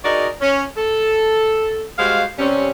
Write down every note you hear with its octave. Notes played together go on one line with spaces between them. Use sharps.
D#4 F#4 G#4 A#4 D5 D#5
C#4
A4
G3 G#3 F#4 C5 F5
C3 G3 C4 C#4